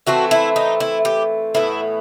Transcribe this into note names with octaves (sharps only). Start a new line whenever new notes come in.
E3 A3 C4 F#4
E4
D#4
E4
G4
A2 E3 B3 E4